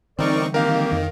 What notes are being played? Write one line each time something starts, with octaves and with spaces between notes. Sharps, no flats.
D3 E3 G3 C4 D#4 A#4 D5 C#6
D#3 A#3 C4 G4 A#4 F5
F2